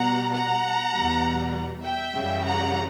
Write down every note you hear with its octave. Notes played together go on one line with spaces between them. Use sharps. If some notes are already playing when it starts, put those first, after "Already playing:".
Already playing: B2 G3 F#5 A#5
F#5 A#5
E2 B2 G3
E5 G5
F#2 C#3 E3 G3
F#5 A#5